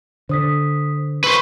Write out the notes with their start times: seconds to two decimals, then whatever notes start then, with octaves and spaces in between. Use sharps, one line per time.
0.29 D3 C5 D#6 B6
1.24 B4 C5 C#6 E6